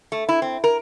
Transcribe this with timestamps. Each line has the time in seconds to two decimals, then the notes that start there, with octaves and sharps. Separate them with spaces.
0.12 A3
0.29 E4
0.42 C4
0.64 A#4